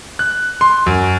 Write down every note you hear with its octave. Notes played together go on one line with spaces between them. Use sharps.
F#6
C6
F#2